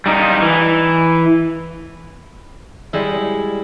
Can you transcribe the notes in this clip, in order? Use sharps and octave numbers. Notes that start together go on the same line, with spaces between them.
G3 D#4
E3
G3 G#3 E4